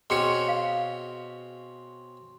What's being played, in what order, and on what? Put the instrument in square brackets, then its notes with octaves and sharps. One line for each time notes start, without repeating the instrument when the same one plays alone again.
[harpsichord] B2 C4 C#4 [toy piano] G#4 [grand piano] C6 C#7
[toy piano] F5